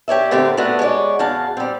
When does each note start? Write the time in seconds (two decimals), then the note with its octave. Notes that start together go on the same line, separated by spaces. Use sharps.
0.08 G4 C#5 D5 E5
0.31 B2 D3 A3 C4 G4 A#4
0.57 A3 B3 D4 F#4
0.79 G#3 B3 C#5 D5
1.19 E2 C#3 F#4 F5 A5
1.57 G3 C4